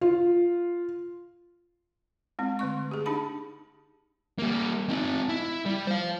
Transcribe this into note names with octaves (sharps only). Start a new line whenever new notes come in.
F4
G#3 C4
D3 A3 C#6
G4 G#4
D4 D#4 G4 A5 B5
G3 A#3
C4 D#4
E4
G3
C5 F5